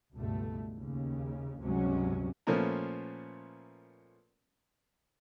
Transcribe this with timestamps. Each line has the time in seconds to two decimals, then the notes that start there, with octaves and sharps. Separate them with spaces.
0.13 C#2 G2 B2 A3
0.76 D#2 C#3
1.63 C#2 G2 C3 F#3 G#3 C#4
2.47 A#2 F3 A3 B3 C#4 A#4